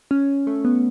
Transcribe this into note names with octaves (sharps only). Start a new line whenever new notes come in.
C#4
A3
B3